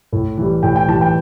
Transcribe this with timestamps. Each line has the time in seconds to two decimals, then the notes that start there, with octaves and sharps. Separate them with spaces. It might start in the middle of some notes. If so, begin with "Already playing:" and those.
0.12 A2
0.38 E3 G3
0.63 A2 G5
0.76 G5
0.88 E3 G3 A5
1.01 G5